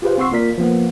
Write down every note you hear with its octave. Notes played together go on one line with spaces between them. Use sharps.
F4 G4 G#4 B4 C5 F5
C4 F#5 C6 C#6 E6 C7
A#3 F4 A#4 D5 B6
F3 A#3 B3